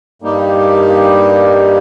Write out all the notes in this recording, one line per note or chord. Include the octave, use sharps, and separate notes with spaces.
G2 G3 A#3 D#4 G4